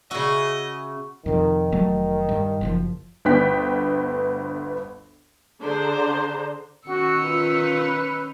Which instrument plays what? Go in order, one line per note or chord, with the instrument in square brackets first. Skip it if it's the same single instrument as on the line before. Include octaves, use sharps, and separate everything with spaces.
[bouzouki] C#3 E5 [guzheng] F#4 [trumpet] D#5
[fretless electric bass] F2 C3 [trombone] D#3
[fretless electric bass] F1 F#3 A3
G2
F#1 C3 F3
[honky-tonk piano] G1 D2 B3 G5 F#6 B6
[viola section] D3 D4 G#4 C5 A#5
[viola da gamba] D#3 C#4 D#4 [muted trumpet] F#4 [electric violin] E6 C#7
[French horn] F4 [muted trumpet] B4